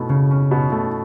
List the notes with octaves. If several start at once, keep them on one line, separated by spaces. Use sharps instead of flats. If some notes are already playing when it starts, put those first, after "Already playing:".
Already playing: B2 A3
C#3 C#4
C#4
B2
A3